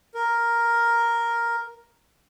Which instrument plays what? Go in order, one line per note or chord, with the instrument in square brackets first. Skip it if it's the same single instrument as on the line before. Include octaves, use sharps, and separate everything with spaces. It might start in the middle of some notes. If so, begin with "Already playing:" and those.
[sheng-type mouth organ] A#4